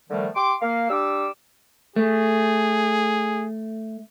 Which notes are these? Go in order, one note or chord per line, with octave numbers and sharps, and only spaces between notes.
D3 D#3 F3 G3 A3
G4 C6 D6
A#3 F5
G3 D4 D6 E6
A3 G#4